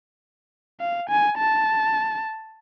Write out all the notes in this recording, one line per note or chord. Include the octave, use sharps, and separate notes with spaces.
F5
G#5
A5